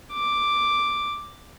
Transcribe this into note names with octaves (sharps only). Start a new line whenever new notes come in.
D6